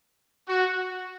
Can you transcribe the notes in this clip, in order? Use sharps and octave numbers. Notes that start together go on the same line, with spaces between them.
F#4